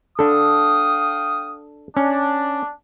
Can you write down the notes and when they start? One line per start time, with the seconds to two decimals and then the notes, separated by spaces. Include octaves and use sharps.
0.19 D4 A4 F5 G5 D#6
1.96 C#4 D4